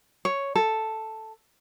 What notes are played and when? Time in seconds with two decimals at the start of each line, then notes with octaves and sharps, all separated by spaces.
0.25 C#5
0.55 A4